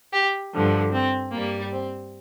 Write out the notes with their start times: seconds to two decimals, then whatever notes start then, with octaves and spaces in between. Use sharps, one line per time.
0.13 G4
0.53 G2 D3 F3
0.92 C4
1.32 G2 G3 A#3
1.73 C4